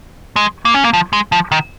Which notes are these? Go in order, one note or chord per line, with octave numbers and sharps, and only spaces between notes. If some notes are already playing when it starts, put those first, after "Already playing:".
G#3
A#3
C#4
A#3
F3
G#3
F3
D#3